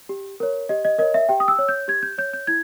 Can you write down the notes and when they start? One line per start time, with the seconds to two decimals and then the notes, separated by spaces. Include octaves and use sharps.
0.09 G4
0.40 A#4 C#5
0.69 G4 D#5
0.85 D#5
0.98 A#4 C#5 D#5
1.14 E5
1.29 G4 G5
1.40 D#6
1.48 E6
1.58 C#5
1.69 G6
1.88 G4 G#6
2.03 G6
2.18 C#5 G6
2.33 G6
2.47 E4 G#6